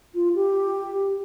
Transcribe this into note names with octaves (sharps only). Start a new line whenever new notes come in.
F4
G4